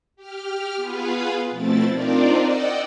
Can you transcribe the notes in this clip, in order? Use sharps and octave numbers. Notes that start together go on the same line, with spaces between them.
G4 F6
B3 F4 G#4 B4 F5
B2 F3 A3 C4 E4 A6
C4 D4 D#4 F4 A#4 D5
D5 D#5 F#5 G5 E6